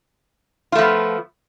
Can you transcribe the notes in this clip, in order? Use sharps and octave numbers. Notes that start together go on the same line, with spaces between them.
F3 A3 B3 F4